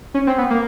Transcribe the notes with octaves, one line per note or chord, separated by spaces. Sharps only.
C#4
C4
B3
A#3